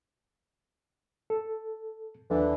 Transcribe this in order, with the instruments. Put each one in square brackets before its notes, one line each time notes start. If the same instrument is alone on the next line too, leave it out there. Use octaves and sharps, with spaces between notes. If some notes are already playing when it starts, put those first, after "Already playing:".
[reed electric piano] A4
[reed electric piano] D#2 F3 D4 [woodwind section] D3 E3